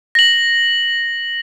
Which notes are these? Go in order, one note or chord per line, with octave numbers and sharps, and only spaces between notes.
A#6 F#7